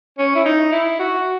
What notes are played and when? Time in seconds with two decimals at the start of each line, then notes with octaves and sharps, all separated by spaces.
0.18 C#4
0.35 E4
0.45 D#4
0.72 E4
0.99 F#4